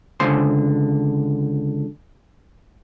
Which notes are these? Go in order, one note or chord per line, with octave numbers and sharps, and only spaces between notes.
C#2 D3 C5 C6